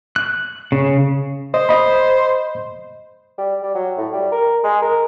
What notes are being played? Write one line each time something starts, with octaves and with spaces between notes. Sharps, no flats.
F#6
C#3
C5 D#5
D#5 B5
G3
G3
F#3
A2
G3
A#4
G#3
A#4